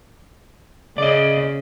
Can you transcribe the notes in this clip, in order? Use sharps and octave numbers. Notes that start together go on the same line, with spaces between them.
C#3 D5 D#5